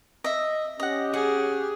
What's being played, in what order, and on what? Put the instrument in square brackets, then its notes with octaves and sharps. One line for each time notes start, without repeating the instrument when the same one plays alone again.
[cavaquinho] D#5 E5
[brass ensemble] C#4 G4 [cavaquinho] D#5 F#5
[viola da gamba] G#4 [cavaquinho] F#5